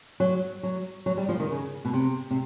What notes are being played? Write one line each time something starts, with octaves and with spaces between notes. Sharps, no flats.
F#3
F#3
F#3
G3
F3
D#3
C#3
B2
C3
C3